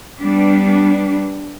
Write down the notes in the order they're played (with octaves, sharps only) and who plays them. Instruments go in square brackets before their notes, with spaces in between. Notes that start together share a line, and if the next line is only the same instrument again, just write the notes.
[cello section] G3 B3 D4